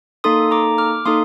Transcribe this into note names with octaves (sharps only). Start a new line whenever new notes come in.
A#3 D#4 A4 C6 D#6
A#5 D6
D6 F6
A#3 D#4 A4 C6 D#6